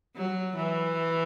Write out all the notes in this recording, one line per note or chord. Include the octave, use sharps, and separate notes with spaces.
F#3
E3